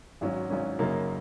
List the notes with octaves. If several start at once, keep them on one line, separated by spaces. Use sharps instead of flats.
G#1 G#2 F#3 C#4
G#1 G#2 F#3 C#4
F#2 C#3 F#3 A#3 D#4